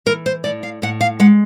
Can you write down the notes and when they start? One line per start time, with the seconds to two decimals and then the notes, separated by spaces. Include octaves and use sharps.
0.06 E3 A#4
0.26 C5
0.44 A2 D5
0.63 F5
0.82 A2 F#5
1.01 F5
1.20 G#3 F#5